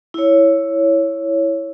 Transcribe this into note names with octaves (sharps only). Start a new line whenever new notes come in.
E4 C#5